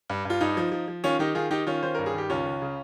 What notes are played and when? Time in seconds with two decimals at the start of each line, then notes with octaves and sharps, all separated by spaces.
0.10 G2
0.25 G2 F4
0.41 G2 D#4
0.57 F3
0.72 F3
0.88 F3
1.04 D#3 C#4 F4
1.19 D#3 D#4 G4
1.35 D#3 F4 G#4
1.51 D#3 D#4 G4
1.67 D#3 C#4 F4
1.83 D#3 C5
1.94 G2 A#4
2.06 G#4
2.14 D#3 G4
2.30 C#2 C#4 F4
2.45 C#2
2.62 C#3